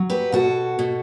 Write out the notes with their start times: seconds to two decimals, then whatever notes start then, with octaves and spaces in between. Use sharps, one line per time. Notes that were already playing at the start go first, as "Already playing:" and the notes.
Already playing: F#3
0.10 G4 B4
0.32 B2 F#4 A4
0.79 B2